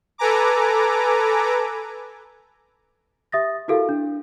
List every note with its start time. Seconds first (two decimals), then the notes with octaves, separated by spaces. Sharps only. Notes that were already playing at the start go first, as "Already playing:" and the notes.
0.18 A4 B4 G#5 A#5 D6
3.32 G4 E5 D#6 A6 A#6
3.68 E4 F#4 G4 A4 A#4 F5
3.89 D4